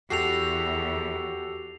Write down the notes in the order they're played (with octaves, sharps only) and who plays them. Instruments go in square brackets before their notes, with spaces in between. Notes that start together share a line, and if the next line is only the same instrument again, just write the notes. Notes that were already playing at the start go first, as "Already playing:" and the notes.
[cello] E2 [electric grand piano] F#4 G4 A4 [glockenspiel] C7 F7